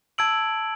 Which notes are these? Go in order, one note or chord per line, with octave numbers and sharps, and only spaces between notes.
A5 E6 G#6 D7 F#7